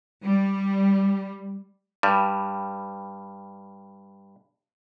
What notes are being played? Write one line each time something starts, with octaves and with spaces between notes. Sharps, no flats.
G3
G2 G3